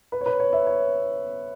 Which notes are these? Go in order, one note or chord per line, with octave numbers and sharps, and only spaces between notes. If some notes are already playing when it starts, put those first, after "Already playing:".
B4
C#5
B4
C#5
E5
C#5